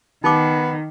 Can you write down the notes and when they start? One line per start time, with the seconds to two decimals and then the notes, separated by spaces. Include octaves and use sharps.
0.24 D#3 B3 D#4 D6